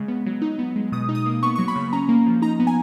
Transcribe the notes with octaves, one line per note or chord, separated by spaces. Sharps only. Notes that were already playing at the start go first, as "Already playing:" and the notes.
Already playing: C#3 G#3
B3
F#3
D#4
B3
G#3
B2 D#6
D#4
D#6
A#3
B3 C#6
F#3 C#6
B5
C#3
C#4 A#5
A#3
F3
D#4 A#5
B3
G#5